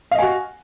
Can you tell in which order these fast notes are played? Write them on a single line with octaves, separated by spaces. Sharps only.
F5 D#5 G#5 F#4